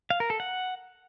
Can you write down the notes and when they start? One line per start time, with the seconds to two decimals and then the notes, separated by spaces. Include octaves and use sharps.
0.10 F5
0.20 A#4
0.30 A4
0.40 F#5